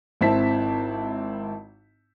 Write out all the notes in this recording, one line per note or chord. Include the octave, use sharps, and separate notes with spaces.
G#1 C4 E4 A5 B6